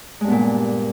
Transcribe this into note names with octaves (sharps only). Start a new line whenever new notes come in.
G2 A#2 G#3 B3